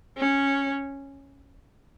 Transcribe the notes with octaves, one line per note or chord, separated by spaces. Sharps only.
C#4